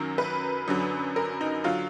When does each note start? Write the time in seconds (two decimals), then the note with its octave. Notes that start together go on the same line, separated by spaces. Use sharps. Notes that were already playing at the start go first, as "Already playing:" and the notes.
Already playing: F#2 D#3 F#3 A#4
0.18 B4
0.68 F#2 D3 F#3
1.16 A#4
1.41 D#4
1.64 D3 F#3 F4